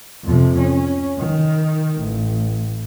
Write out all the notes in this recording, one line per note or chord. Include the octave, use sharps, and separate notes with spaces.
F2 C3
C#4
D#3
A1